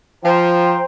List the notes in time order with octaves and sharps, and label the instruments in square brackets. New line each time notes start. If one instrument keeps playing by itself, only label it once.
[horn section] F3 [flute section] C5 G5 A#5